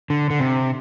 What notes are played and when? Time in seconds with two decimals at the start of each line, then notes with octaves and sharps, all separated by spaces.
0.10 D3
0.30 D3
0.39 C3